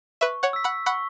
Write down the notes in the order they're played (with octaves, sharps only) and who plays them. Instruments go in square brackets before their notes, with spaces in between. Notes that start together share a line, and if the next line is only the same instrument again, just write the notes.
[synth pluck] B4 E5 [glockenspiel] C#6
[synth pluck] C#5 F#5
[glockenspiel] E6 B6
[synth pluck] F#5 B5
[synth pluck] F#5 B5 [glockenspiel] C#6